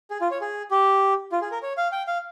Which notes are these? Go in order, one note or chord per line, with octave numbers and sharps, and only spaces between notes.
G#4
F4
C#5
G#4
G4
F4
G#4
A#4
C#5
F5
G5
F5